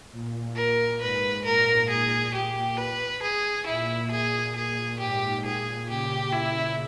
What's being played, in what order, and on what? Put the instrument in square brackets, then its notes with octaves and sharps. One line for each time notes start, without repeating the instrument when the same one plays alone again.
[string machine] A#2
[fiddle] A#4
[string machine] G#2 [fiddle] B4
[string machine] A#2 [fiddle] A#4
[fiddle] G#4
[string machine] A#2 [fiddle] G4
[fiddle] B4
G#4
[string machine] A#2 [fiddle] E4
[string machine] A#2 [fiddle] G#4
[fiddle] G#4
[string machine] G#2 [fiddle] G4
[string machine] A#2 [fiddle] G#4
[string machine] C#3 [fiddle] G4
[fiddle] E4